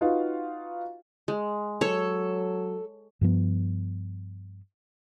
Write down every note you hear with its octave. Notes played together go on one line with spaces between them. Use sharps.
D#4 F4 F#4 B4 F5
G#3
F#3 A4 C#5
G2 F3 B3